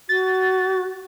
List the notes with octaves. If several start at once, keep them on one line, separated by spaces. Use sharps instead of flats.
F#4 A6